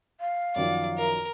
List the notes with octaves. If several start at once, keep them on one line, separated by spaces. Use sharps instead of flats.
F5
F#2 D#3 F3 D5
A#4